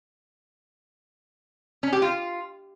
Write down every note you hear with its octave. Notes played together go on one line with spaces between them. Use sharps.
C#4
G4
F4